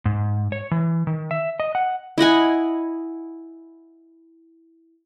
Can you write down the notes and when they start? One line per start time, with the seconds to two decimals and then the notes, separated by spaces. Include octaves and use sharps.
0.05 G#2
0.52 C#5
0.71 E3
1.07 D#3
1.31 E5
1.60 D#5
1.75 F#5
2.18 E4 D#5 F#5 G#5